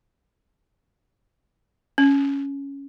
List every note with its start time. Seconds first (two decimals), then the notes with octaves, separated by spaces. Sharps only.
1.98 C#4